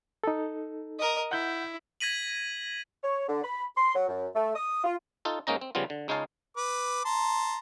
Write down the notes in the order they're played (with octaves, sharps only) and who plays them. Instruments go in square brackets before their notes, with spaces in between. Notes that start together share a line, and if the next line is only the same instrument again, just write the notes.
[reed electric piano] D#4 A4
[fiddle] A#4 D#5
[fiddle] E4 [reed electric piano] F#5 G6
[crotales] G#6 A#6 B6 D#7 F#7
[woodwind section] C#5
D3
B5
C6
F#3
F#2
A3
D#6
F4
[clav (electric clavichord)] D#4 F4 A4
G#2 A#3 C#4 D#4 A#5
C4
C#3 F3 G3 B3 F4
D3
C#2 G#3 D#4 C#5 F5 A5
[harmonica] B4 D6
A5 A#5 C6